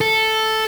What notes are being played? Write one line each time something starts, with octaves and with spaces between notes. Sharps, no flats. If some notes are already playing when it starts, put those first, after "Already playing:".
A4